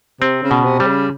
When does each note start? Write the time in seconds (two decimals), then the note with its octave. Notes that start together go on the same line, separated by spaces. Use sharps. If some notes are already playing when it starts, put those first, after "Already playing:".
0.20 C3 C4
0.43 C#3
0.51 B2
0.65 C3
0.79 C3 G3
0.87 C#3